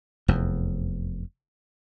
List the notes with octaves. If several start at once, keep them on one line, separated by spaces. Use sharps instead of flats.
F1 E2